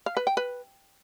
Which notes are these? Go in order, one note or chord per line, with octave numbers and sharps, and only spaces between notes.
F5
B4
G5
B4